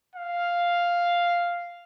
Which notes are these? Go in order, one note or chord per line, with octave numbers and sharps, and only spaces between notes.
F5